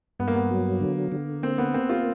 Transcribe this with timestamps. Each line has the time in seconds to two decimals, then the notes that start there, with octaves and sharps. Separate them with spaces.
0.19 G2 B3
0.28 A#3
0.35 B3
0.51 F#3
0.81 D3
1.12 D3
1.43 A#3 C4
1.58 B3
1.74 A#3 C4
1.90 F4